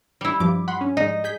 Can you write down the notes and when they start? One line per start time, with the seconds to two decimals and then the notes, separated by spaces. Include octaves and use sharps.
0.21 G3 E4
0.40 G2 F3 D6
0.68 F#5 B5 C6
0.81 C#4
0.97 G#2 G#3 D#4 D#5
1.24 G#4 G6 B6